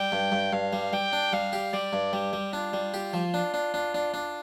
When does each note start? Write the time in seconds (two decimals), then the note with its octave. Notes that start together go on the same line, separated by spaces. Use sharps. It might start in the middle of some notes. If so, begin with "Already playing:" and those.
Already playing: G3 G5
0.12 G2
0.32 G2
0.53 G2 F5
0.73 G3
0.93 G3 G5
1.13 D4
1.33 G3 F5
1.53 G4
1.73 G3 D5
1.93 G2
2.13 G3 G4
2.33 G3
2.53 D4 F4
2.73 G3
2.94 G4
3.13 F3
3.34 D4
3.54 D4
3.74 D4
3.94 D4
4.14 D4